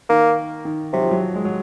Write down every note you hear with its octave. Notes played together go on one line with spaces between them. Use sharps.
D#3 A#3
D#3
C3 F#3
F3
F#3
G#3
F#3